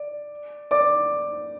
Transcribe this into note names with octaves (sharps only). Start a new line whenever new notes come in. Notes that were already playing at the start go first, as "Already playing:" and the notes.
Already playing: D5
D5 D6